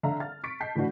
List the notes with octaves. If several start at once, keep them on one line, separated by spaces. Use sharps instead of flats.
D3 E5 F5 A#5
F6 A6
C#6 A6 B6 C#7 D7
D#5 A5 G6 B6 C7
A2 D3 E3 D4 F#4